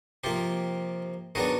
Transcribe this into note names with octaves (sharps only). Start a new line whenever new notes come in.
C3 F3 A#3 F4 G4
D#3 F#3 B3 D4 F#4 G#4